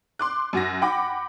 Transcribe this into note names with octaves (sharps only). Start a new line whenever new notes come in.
C6 D6 F#6
F#2 F#4 A#6
F#5 G5 B5 D6